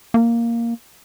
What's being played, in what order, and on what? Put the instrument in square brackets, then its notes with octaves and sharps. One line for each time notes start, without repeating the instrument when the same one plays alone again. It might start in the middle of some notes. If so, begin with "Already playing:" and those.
[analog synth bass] A#3